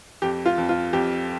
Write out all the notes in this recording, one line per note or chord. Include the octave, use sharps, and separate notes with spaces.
F2 G4
F4
F2
F4
F2 G4